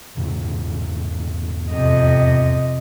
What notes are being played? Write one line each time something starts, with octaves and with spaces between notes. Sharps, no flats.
E2 G#2 C#3
F2 C3 D#5